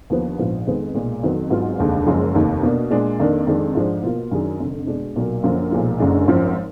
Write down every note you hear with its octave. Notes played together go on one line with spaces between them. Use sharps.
D#2 D3 F3 B3
A#1 G#2 F3 B3 F4
F2 D#3 G#3 B3
B1 A#2 G#3
F2 D#3 F#3 B3
G#1 G#2 F#3 B3 F4
F1 D#2 D3 G#3
F#1 F#2 F3 G#3
F1 D#2 D#3
B2 A#3 D4
A#2 G#3 D4
F2 D#3 A#3 D4
F2 D#3 G#3 D4
G#2 F3 G#3 D4
B2 A#3 F4
F#2 D#3 F#3 D4 G#4
F1 F2 D3
B2 G#3 D4
B1 A#2 F#3 A#3
F#2 D3 F3 A#3 F4
B1 A#2 F3 G#3
F#1 F#2 D3 G#3 D4
G#1 F#2 F3